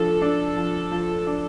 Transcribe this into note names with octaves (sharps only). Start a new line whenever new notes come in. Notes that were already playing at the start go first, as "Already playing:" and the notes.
Already playing: F3 D4 A4
D4
F3
F3
D4